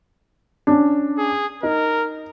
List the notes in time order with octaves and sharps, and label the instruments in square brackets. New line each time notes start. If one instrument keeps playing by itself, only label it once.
[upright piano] C#4 D4
[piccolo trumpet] G#4
[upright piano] D#4 [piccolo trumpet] A#4